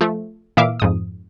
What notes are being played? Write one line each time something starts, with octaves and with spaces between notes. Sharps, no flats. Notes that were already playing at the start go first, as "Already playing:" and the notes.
F3 A3
A#2 E3 E5 F5 D6
F2 G#2 D#6